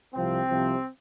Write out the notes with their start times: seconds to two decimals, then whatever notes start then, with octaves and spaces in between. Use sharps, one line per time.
0.14 C2 C3 F3 C4
0.48 C2 C3 F3